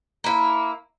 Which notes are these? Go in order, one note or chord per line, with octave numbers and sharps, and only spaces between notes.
A#3 E4